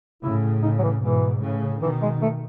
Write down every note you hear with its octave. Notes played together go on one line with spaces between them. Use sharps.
A2 C#3 E4
D#4
F#3
E3
G#2 B2 E3
A2 C#3
B2 D#3 E3
G#3
A3